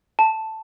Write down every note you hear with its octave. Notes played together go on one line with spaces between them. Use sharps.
A5